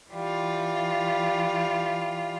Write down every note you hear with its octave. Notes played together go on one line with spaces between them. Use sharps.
E3 G3 F4